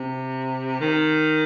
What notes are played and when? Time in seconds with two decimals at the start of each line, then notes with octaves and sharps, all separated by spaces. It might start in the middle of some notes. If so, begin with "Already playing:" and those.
Already playing: C3
0.80 D#3